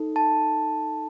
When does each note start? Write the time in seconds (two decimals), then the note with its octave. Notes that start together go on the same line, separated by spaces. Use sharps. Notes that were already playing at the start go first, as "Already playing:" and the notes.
Already playing: D#4 A4
0.16 A5